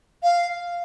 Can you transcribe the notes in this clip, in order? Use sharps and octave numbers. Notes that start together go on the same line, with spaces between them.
F5